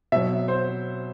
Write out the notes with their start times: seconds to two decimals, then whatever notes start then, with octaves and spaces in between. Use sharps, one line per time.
0.12 B2 F#3 E5
0.48 C5